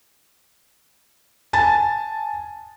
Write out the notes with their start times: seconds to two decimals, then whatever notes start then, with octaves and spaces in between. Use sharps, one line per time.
1.53 G#5 A5 A6